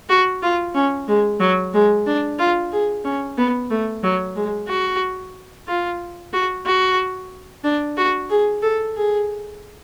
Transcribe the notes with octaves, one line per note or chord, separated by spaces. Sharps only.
F#4
F4
C#4
G#3
F#3
G#3
D4
F4
G#4
C#4
B3
A3
F#3
G#3
F#4
F4
F#4
F#4
D4
F#4
G#4
A4
G#4